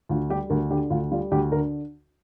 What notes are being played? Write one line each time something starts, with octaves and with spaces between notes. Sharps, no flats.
D2 F4
G3 G4
D2 A#4
D3 G4
D2 F4
G3 F4
D2 G4
D3 A#4